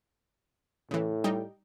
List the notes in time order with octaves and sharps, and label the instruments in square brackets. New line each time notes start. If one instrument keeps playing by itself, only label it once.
[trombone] A2 [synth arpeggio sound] C#3 E3
[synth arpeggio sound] G3 D#4 G5